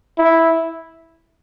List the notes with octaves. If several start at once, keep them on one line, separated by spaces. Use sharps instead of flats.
E4